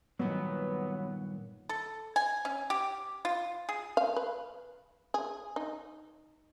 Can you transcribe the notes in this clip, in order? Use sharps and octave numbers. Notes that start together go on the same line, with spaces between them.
G2 A#2 D#3 F#3 B3
A4
G#5
C#4
G4
F4
G#4
F5
B4
G#4
D#4